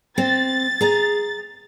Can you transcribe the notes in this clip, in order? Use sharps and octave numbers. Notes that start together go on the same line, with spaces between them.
C4 A6
G#4 A#5